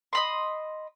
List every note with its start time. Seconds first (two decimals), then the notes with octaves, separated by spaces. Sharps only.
0.13 D#5 B5 C6